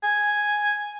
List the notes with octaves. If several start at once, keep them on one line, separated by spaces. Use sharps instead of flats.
G#5